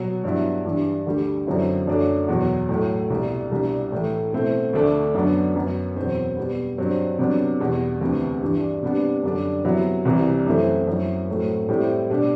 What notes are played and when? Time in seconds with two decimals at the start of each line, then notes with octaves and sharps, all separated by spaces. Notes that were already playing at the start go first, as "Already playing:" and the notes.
Already playing: B2 F#3
0.24 G2 F#3 B3 E4
0.65 G2 E3 G3 D4
1.06 D2 D3 G3
1.46 F#2 D3 F#3 C4 E4
1.87 F#2 F#3 A3 D4
2.28 E2 B2 F#3
2.69 A2 F#3 A3
3.10 C2 B2 G3
3.51 C2 B2 G3 D4
3.92 A2 E3 A3
4.33 B2 A3 C4 E4
4.73 D2 D3 A3 D4
5.14 F#2 D3 F#3 B3 D4
5.56 F#2 F#3 B3
5.96 E2 B2 F#3 C4
6.37 B2 G3 B3
6.78 G2 F#3 C4
7.19 C3 F#3 B3 D4
7.60 E2 B2 G3
8.01 D2 C3 E3 B3
8.41 G2 E3 G3 D4
8.83 C3 G3 B3 D4
9.23 F#2 D3 G3 D4
9.65 C3 F#3 B3 E4
10.05 C2 C3 E3 G3
10.46 F#2 E3 A3 C4 E4
10.87 F#2 F#3 C4 E4
11.28 A2 F#3 A3 C4
11.69 A2 G3 C4 E4
12.10 B2 G3 D4